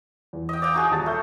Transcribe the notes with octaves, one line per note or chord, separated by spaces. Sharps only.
E2
D#5 G5
D5 F5 G5
D#4 F#4 G#4
D#1 A5 A6
A3 C#6 G6